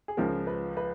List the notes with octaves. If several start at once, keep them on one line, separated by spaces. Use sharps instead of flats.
G#4
C#2 C#3 F3 A#4
B4
B4